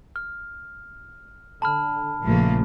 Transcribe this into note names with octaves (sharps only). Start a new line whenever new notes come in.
F6
D3 A5 B5 F6
A#1 A#2 C#3 F3 A3 A#3